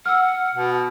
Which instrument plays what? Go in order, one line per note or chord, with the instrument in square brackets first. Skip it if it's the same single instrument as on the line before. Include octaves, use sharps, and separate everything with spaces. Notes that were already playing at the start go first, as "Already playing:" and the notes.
[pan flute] F#5 [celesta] E6 F6
[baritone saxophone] B2